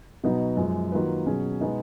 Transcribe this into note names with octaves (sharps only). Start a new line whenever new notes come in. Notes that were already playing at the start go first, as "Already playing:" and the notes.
B2 F#3 B3 D#4
F#2 F3 G#3
D#3 F#3 A#3 F4 B4
B2 F#3 C#4 G#4
B2 G#3 B3 D#4